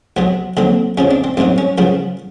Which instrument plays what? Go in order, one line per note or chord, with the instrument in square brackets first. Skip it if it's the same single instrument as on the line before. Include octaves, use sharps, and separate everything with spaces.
[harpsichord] B1 B2 F#3 B3
D#2 D3 F#3 C4
F2 C#3 F3 C#4
D4
C4
A1 G2 D#3 F#3 C4
C#4
F#2 C#3 F3 B3